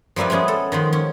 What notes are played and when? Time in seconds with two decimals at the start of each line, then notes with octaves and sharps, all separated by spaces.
0.16 F3 G3 A#3 E4 B4
0.30 G#3 B3 C#4 G#4
0.48 A4
0.72 D#3 F3 G#3
0.93 C#4